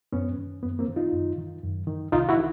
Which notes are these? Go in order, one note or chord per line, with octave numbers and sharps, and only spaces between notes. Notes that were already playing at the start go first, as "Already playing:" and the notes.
F#2 B3 C#4
D#3
F#2 B3
A#3 C4
D#3
D#4 F4
F#2
D#3
F#2
D#3
C2 D#4 F4
E4 F#4
D#3